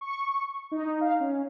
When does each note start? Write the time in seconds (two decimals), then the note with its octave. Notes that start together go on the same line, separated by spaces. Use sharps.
0.01 C#6
0.72 D#4
1.01 F5
1.20 C#4